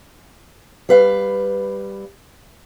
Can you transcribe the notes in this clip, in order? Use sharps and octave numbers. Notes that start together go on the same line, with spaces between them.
G3 B4 F5